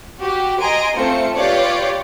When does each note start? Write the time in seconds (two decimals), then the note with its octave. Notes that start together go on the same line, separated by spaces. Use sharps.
0.18 F#4 G4
0.60 D#5 G#5 A#5 C6 D7
0.95 A3 C4 F4 C#7
1.34 F4 G4 B4 C#5 D5